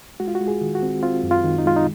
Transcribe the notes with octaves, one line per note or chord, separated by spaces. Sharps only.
G#3 F#4
F4
F#4
G#3
G#4
D#3
F#4
C4
C4 F4
F#2
F4
D#3
D#4
G#3 F4
D#4